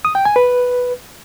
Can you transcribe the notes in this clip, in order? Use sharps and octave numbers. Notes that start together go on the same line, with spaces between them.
D#6
G5
G#5
B4